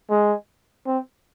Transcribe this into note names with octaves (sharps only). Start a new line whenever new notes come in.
G#3
C4